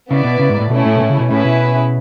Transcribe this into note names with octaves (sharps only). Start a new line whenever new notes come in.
C#3 B3 E4 B4 D5
B2
C#3
G#2
A2
B2 A3 C#4 E4
A2
B2
A2
C#3
B2
A2 C#4 E4 G#4 B4
B2